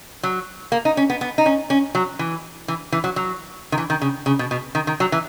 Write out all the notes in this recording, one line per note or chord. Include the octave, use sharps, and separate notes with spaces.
F#3
A#3
D#4
C#4
B3
B3
D#4
C#4
C#4
F#3
E3
E3
E3
F#3
F#3
D#3
E3
D#3
C#3
C#3
B2
B2
D#3
D#3
F#3
E3